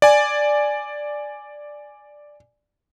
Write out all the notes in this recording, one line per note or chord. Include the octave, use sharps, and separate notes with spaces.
D5 G#5